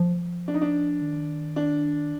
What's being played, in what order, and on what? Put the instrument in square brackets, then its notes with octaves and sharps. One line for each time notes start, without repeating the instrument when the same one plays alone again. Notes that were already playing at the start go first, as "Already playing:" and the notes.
Already playing: [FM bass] F3
[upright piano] D4
D#4
D4
[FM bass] D#3
[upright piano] D4